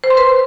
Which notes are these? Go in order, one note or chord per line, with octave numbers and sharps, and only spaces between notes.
C5
C6
B4